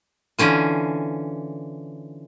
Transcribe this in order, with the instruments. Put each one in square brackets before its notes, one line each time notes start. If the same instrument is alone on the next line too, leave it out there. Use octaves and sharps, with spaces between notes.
[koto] D3 E3 C#4 F4